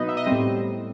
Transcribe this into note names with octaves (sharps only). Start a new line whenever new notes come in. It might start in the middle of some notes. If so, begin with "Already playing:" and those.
Already playing: B2 F#3 B3 D#4 B4 D#5
E5
D#5
G3 C4 C5
A2